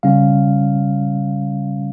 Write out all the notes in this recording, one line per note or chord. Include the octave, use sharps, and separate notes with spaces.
C#3 G3 C#4 F5